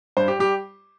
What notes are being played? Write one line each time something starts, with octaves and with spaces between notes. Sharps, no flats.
G2 C5
G4
G3 G4